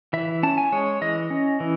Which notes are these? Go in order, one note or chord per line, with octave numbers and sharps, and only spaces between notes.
E3 E5
C#4 A5
G#5
G#3 C#5
E3 D#5
C#4
E3